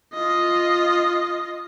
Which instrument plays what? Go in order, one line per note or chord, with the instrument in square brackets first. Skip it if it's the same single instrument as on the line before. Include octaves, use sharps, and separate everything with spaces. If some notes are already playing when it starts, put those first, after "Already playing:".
[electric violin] F4 D#5